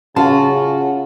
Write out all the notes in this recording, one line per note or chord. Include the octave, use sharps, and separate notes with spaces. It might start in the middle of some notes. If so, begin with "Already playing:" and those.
C#3 C#4 F4 F#4 A5